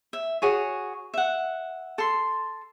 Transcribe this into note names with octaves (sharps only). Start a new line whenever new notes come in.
E5
F#4 G#4 C#5
E5 F#5
A4 C6